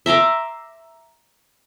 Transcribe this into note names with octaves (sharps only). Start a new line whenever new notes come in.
E5 A#5 C6 D6